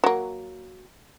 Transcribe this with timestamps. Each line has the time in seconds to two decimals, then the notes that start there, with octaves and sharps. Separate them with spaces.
0.04 F#3 A#3